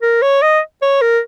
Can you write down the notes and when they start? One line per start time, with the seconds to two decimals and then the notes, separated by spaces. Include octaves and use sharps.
0.02 A#4
0.22 C#5
0.42 D#5
0.82 C#5
1.02 A#4